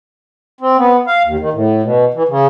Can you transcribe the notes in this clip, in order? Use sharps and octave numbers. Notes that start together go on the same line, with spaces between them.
C4
B3
F5
D#2
D#3
A2
B2
E3
C#3